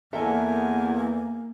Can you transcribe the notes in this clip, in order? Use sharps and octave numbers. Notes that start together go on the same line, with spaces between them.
E2 A#3 A4 A#4 E5 G#5